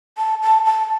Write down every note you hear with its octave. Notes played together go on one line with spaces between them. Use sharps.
A5
A5
A5